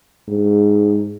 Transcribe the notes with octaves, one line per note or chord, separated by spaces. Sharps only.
G#2